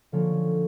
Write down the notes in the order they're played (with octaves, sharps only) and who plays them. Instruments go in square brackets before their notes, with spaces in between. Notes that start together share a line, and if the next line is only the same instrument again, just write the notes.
[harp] D3 F3 A#3 C#4